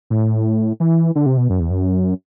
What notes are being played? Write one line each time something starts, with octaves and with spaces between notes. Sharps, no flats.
A2
E3
D3
C3
B2
F#2
E2
F#2